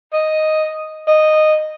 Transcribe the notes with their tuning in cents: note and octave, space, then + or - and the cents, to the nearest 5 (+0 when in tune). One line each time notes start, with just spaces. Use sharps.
D#5 +0
D#5 -10